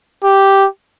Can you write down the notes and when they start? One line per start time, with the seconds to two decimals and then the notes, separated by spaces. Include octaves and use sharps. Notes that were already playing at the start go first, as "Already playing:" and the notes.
0.24 G4